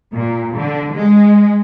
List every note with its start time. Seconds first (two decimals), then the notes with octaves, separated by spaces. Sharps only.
0.14 A#2
0.55 D3
0.93 G#3